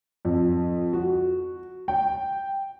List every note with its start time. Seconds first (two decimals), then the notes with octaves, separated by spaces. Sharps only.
0.25 F2
0.93 F#4
1.88 G5